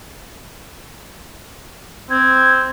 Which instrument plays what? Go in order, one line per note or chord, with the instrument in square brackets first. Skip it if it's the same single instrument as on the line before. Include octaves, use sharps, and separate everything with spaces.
[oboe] C4 [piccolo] G#6